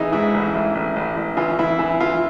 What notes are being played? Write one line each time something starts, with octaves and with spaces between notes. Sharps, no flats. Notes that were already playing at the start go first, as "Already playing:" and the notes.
Already playing: A1 E3 D#4 G#4
G#2 E4
A1
A1
A1
A1
A1
E3 F4
E3 E4
E3 E4
E3 F4